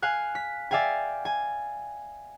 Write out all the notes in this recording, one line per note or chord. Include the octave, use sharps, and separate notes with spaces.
F5 G#5 F#6
B6
D5 E5 F5 G5 G#5
G#5